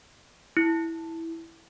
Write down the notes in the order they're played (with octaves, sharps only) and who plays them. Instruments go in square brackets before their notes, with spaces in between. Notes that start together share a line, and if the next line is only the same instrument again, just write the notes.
[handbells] E4